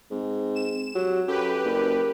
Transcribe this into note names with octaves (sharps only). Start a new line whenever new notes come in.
G#2 C4
E7
F#3 G4
F#2 G4 A4 B4
F#1 A#4